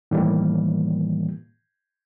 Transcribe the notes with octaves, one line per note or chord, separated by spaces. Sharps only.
A2 D#3 E3 G3 A#3